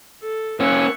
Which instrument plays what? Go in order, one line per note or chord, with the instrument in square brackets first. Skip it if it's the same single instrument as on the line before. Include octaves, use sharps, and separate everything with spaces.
[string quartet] A4
[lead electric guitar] A#3 C#4 [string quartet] E5 C#6 F#6